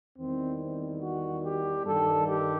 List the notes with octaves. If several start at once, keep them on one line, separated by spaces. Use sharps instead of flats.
E2 D#3 G3 C4
F#4
G4
G2 D#3 G3 A4
G4